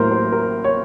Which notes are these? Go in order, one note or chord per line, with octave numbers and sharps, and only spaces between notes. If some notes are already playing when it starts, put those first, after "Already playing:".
Already playing: A1 A2 F#3 A#3 A#4 C5
C5
A#4
C#5